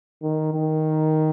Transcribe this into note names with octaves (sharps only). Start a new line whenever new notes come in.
D#3
D#3